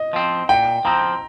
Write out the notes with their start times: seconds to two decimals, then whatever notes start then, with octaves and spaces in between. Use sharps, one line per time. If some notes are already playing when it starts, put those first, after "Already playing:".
Already playing: D#5
0.13 F3 C4
0.49 A#2 G5
0.85 F3 C4 A#5